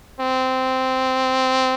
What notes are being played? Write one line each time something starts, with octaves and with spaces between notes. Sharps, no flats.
C4